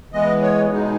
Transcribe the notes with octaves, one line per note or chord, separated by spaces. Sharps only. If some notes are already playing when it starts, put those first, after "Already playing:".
E3 G#3 B3 D#5
C#5
B2 G#3 D#4